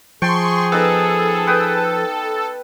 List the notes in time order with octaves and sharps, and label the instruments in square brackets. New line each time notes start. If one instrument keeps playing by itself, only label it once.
[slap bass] F3 [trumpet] G#4 [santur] G5 A5 [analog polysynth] C6 C#6
[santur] B3 D#4 [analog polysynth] A4
[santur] B4 G5 D#6